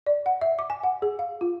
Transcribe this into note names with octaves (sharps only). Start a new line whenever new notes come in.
D5
F#5
E5
D6
G#5
F#5
G#4
F5
F4